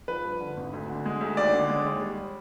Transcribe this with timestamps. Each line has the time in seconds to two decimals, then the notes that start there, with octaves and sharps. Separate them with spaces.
0.08 F3 B4
0.25 G2
0.41 D3
0.57 G#1
0.74 D2
0.90 D3
1.06 G#3
1.21 D2
1.37 D#2 D5
1.54 D3
1.70 G#3
1.86 D#2
2.01 G3